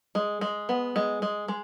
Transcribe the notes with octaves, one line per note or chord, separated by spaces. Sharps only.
G#3
G#3
B3
G#3
G#3
G#3